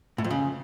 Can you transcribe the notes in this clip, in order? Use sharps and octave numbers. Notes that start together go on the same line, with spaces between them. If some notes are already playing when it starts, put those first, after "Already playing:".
A2
F2
C#3